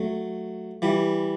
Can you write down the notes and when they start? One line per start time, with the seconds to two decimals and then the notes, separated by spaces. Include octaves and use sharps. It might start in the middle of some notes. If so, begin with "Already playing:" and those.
Already playing: F#3 A3
0.82 E3 G3